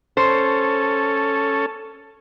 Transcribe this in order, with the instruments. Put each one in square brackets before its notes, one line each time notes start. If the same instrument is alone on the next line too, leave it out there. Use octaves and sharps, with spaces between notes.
[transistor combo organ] C#4 A4 [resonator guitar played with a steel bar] C5